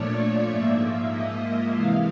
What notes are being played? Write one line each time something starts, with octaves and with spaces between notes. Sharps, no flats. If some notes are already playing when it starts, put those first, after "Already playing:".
Already playing: A#2 F3 A3 D4 C#5 D5
G#2 F3 A#3 E5
D#5
C3 E3 G#3 F5